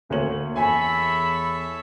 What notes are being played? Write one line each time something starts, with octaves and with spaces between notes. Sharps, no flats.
D2 A#3 C#5 F#7
E2 A4 C#5 E5 G#5 B5